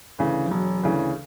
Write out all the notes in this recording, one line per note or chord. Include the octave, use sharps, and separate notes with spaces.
D2 C#3 E3
F3
E1 F#3
D2 C#3 E3